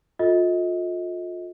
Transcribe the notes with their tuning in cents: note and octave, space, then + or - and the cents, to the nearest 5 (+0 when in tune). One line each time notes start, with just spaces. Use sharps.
F4 +30 A4 +0 D#5 +30